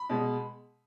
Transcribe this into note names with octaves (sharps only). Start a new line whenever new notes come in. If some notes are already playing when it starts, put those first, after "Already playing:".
Already playing: B5
B2 G#3